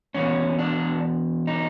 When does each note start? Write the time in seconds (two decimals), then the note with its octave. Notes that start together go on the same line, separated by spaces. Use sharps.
0.14 E2 B2 C#4
0.59 D4
1.47 D#4